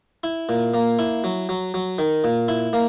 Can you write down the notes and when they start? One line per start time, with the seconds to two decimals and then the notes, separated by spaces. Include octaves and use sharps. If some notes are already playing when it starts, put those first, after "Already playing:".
0.24 E4
0.49 A#2
0.74 A#3
0.99 E4
1.24 F#3
1.49 F#3
1.74 F#3
1.98 D#3
2.24 A#2
2.48 E4
2.73 A#3